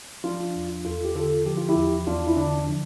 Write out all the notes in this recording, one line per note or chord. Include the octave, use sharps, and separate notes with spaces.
F3 D4 F4
E2
E2 F4 A4
G4
D3 F4 A4
F3 G4
F4
E4 G4
E2
E2 D4 F4
E4
D3 D4
F3 D4